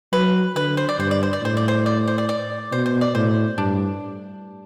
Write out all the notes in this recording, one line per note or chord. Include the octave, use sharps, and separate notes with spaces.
F#3 B4
D3 B4
C5
D5
G2 C5
D5
C5
D5
A2 C5
D5
C5
D5
C5
D5
D5
B2 C5
C5
D5
A2 C5
G2 D4